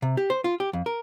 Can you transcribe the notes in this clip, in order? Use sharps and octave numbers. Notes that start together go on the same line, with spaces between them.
C3
G4
C5
F4
G4
F2
A#4